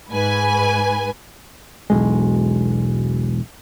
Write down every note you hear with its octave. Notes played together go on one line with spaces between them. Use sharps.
G#2 B4 G#5
E1 B1 G#3